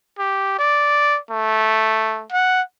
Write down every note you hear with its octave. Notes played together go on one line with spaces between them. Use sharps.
G4
D5
A3
F#5